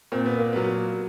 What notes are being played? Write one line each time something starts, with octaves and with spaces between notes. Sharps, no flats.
A#2 C4
B3
A#3
F#3 B3